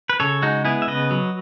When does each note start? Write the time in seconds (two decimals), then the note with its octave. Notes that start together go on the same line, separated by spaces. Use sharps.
0.10 B4
0.20 C#3 A4 C#5
0.42 G#3 D#4 F#4
0.65 B3 E4 G#4
0.82 E5
0.87 C#3 B4 D#5
1.11 F#3